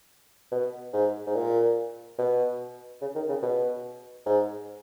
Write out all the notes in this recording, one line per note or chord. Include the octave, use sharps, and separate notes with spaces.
B2
G#2
G#2
A#2
B2
C#3
D#3
C#3
B2
G#2